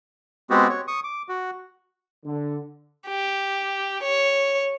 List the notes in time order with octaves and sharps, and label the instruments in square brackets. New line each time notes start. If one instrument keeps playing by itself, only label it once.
[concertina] G#3 B3 C4 F#4 G4
C#5
C#6 D#6
D6
F#4
[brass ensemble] D3
[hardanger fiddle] G4
C#5